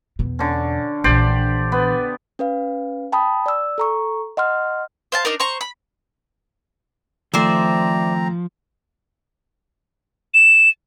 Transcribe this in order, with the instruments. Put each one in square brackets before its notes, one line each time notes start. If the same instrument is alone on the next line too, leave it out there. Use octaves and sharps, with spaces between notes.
[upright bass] E2 B2
[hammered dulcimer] D3 C#4
[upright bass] A#1 E3 [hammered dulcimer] G4 C5 D5
[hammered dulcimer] B3
[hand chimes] C#4 B4 F5
G5 A5 B5 D#6
D5 E6
A4 A#5 C#6
D#5 F#5 C6 F6
[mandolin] C5 F5 A5
D4 D#4 A#4
C5 A#5 C#6
B5
[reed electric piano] D#3 A3 [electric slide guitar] F3 [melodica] C4 A#5 [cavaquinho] C5 D5 E5
[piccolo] E7